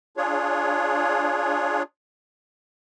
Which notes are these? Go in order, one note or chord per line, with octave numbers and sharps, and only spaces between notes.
D4 F4 G#4 C#5